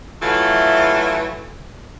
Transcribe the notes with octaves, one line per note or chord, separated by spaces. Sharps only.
E3 F#3 A3 F4 E5